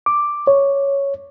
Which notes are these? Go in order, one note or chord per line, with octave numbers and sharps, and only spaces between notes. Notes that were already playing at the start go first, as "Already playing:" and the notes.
D6
C#5